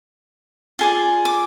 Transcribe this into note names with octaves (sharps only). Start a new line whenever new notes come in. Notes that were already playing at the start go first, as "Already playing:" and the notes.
F4 G#4 D5
D6